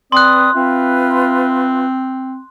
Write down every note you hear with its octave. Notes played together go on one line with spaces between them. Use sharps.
C4 B4 D5 C6 D#6 F#6
C4 F4 B4 E5